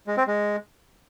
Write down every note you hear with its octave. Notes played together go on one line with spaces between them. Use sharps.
G#3
C4
G#3